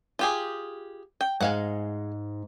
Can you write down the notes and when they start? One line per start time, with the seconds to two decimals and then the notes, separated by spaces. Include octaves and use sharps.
0.19 F4 G4 G#4
1.21 G5
1.40 G#2 G#3 F5 F#5